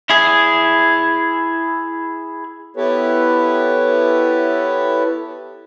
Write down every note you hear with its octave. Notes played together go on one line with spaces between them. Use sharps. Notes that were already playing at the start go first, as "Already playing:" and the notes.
E4 G#4
B3 E4 G4 A4 B4 C#5